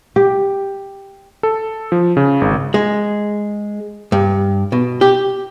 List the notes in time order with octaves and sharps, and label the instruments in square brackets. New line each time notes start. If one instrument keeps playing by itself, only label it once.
[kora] G4
[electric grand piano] A4
F3
C#3
G#1
[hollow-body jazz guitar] G#3
G2
B2
G4